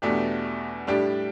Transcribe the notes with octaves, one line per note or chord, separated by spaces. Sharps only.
E2 B2 A3 D4 G4
A2 G3 D4 G4